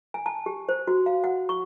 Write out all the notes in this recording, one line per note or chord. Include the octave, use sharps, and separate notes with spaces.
G#5
A5
G4
C5
F#4
F5
F#5
C#6